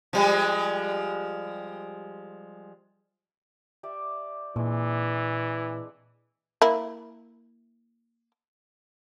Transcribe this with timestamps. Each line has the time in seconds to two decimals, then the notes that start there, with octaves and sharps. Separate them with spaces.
0.13 F3 G3 G#3
3.83 G4 D5 E5
4.56 A#2 E3 G#3 C4 D4
6.62 A#3 E4